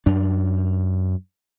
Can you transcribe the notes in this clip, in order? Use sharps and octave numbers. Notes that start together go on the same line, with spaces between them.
F#2 D4